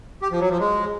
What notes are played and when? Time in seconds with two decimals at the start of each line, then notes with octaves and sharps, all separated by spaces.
0.22 G4
0.31 F3
0.41 F#3
0.50 F3
0.59 G#3